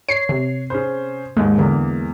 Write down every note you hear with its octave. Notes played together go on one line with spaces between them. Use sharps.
C#5 C7
C3
C#4 G#4 C5
D#2 G#2 G#3
E2 D3 A#3